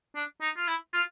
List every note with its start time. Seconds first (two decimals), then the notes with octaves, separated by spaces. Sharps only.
0.15 D4
0.41 D#4
0.57 F4
0.67 E4
0.93 F4